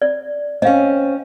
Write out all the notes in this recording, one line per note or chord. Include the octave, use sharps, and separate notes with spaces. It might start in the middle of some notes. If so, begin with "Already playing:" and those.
D5
C4 C#4 D#5 F5